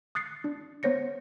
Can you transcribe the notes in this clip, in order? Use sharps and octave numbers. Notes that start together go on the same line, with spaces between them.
D#6 F#6 A6 C7 C#7
D4
B3 C5 C#5 A#6 C#7